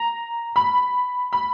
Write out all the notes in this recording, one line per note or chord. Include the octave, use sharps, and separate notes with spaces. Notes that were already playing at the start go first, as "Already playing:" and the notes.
Already playing: A#5
B5
B5